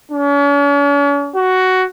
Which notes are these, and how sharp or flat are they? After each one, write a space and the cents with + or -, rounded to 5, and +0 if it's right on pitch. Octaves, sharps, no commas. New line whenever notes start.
C#4 +45
F#4 +10